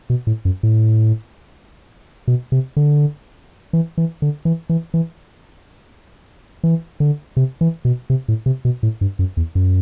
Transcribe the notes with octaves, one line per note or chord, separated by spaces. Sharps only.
B2
A2
F#2
A2
B2
C3
D3
E3
E3
D3
E3
E3
E3
E3
D3
C3
E3
B2
C3
A2
C3
B2
A2
G2
F#2
E2
F#2